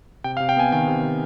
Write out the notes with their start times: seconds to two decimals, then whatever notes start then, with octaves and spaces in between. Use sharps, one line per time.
0.24 C3 G5
0.37 F5
0.40 C3
0.49 G5
0.57 B3 G#5
0.72 D#3 G5
0.88 C3
1.03 C3